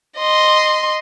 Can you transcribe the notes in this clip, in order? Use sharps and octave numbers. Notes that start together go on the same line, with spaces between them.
D#5 C6